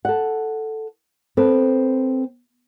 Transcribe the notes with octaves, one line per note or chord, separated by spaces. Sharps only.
A4 F#5
C4 A4 B4